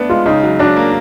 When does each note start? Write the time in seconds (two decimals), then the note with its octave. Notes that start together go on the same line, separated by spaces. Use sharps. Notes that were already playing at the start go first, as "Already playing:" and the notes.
Already playing: A3 B3 D4
0.10 G#3 F4
0.26 C#3 D#4
0.43 F#3
0.59 F#3 D4
0.76 A#3